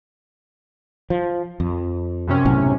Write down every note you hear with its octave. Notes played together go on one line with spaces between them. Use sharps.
F3
F2
F#2 C3 C#4
B1 A2 C4